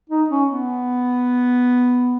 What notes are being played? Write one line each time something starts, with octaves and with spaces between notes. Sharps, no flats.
D#4
C#4
B3